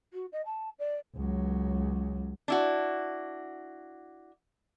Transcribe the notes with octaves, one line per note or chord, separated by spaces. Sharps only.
F#4
D#5
A5
D5
C#2 F#3
D4 E4 F#4